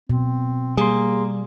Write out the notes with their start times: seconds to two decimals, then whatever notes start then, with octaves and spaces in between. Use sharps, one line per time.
0.09 B2 C4
0.77 G3 A#3 G#4 C6